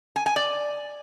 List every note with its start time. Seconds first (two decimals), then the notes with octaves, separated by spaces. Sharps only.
0.16 G#5
0.26 G#5
0.36 D5